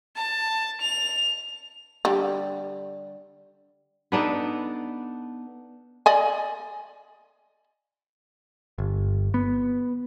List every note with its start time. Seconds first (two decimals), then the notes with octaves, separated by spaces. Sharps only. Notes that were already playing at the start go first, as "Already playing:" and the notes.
0.16 A5
0.81 F7
2.05 D3 G3
4.12 B3 D4 D#4 A4
6.06 D5 D#5 G#5
8.78 G1
9.34 B3